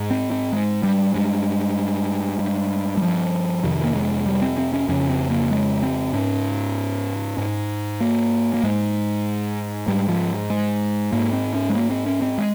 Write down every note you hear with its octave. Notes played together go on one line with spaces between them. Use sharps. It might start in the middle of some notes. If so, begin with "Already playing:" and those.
Already playing: G#2
C4
C4
G#3
G3
G2 G#3
G2
G3
F3
F2 C3 D#3
A#3
G#3
G3
C4
C4
C#4
F2 C#3 C#4
C4
A#3
G#3
C4
G#2 C#4
G#2
A#3
A#3
G#2 G#3
G#2 G3
F3
G#3
G#2 A#3
C4
C#4
G#3
A#3
C4
C#4
C4
G#3